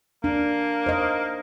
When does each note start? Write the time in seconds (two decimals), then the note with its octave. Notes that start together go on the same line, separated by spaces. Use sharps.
0.24 A#3 D4
0.86 C5 D#5